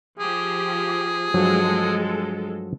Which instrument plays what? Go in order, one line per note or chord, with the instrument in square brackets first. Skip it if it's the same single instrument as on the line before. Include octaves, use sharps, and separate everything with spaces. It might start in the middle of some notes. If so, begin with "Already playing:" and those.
[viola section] F3 G4 [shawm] G#4
[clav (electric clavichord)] G2 F3 F#3 [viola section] G#3 A4